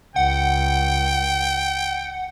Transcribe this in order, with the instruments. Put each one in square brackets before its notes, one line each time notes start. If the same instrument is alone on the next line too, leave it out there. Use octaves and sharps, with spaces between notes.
[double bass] C#2 [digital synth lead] F#5 [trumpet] G5